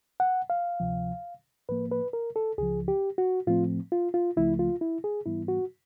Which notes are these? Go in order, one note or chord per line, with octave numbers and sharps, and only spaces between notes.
F#5
F5
D2 C3 F3
A2 F3 A#3 B4
B4
A#4
A4
C#2 C#3 F3 G#4
G4
F#4
A2 F3 A3 C4 F4
F4
F4
C#2 C#3 F3 A3 E4
F4
E4
G#4
G#2 E3 G3 B3 E4
F#4